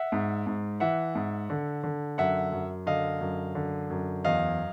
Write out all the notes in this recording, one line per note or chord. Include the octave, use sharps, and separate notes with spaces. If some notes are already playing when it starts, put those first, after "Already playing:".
Already playing: E5 F#5
G#2
G#2
E3 E5 F#5
G#2
D3
D3
F#2 E5 F#5
F#2
D3 D#5 F5
F#2
D3
F#2
E2 D#5 F5